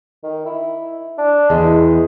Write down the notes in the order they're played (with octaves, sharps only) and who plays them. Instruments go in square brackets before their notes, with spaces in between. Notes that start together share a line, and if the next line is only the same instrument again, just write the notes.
[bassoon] D#3
E4
D4
[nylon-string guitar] E2 [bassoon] G#3